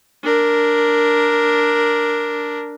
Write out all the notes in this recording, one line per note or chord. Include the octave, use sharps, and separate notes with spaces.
D4 A#4